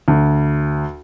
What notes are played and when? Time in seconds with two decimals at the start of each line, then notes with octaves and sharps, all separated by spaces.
0.08 D2